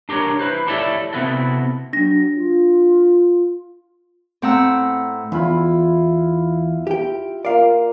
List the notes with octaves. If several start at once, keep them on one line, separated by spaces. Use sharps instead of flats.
D4 G4 A#4 B4 C#5
E4 B4 C5
E4 G4 A4 C#5 D5 E5
C3 B3 C4 E4 F#4 A4
F#3 D4 A#6
F4
A2 C4 F#5 A#5 E6
E2 E4 F4 B5
G4 G5
A#3 F4 D5 F5